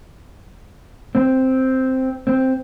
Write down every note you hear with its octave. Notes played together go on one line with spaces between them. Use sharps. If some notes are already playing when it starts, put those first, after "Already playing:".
C4
C4